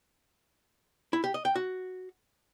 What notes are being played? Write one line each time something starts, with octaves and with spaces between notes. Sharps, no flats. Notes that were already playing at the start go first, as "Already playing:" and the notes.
E4
G4
D#5
G5
F#4